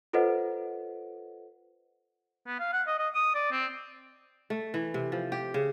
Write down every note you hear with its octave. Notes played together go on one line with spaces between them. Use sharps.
F4 A4 B4 C5 D#5 F#5
B3
F5
F#5
D#5
D#5
D#6
D5
C4
A3
E3
C3
F3
G4
C#3